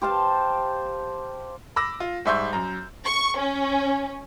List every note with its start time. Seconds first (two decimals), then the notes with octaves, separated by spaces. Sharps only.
0.01 G4 C5 F5 A5
1.76 B5 D6 E6 A#6
2.00 F4
2.25 G#2 G3 E5 C6 C#6 G6
2.53 F#2 A#5
3.05 C#6
3.37 C#4